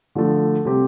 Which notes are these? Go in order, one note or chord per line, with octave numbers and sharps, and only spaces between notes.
D3 F3 A3
C3 G3 C4 G4